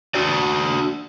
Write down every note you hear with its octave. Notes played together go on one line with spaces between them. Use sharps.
D4 F#4 D5